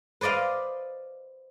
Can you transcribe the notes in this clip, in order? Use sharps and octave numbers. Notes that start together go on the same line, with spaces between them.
B4 C5 D5 D#5 F5